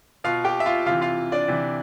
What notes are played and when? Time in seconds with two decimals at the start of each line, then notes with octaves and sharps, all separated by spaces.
0.24 B2 F4 F5
0.44 G4 G5
0.60 E5
0.66 F4 F5
0.86 C3 E3 F4 F5
1.01 F4 F5
1.32 D4 D5
1.48 C3 E3